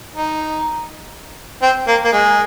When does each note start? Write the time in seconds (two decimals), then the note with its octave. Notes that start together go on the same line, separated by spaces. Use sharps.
0.16 D#4
1.62 C4
1.87 A#3
2.05 A#3
2.12 G#3